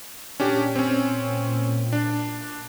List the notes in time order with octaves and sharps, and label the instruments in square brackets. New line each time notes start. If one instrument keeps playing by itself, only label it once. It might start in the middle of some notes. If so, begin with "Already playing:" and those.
[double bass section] A#2 [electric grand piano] C#4 D4 G4
[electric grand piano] C4 C#4
D4